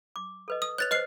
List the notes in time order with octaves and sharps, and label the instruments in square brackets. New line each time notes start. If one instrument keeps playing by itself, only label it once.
[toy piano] D6
A4 B4 D#5
[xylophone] D#6
[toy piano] B4 C#5 [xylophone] F#6 A6 F7
[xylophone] B4 F6 C7 [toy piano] C5 D#5